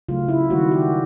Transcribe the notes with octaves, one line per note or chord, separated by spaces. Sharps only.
C#3 F#3 A3 F4
E4
D#3 G3 A#3 F#4
G4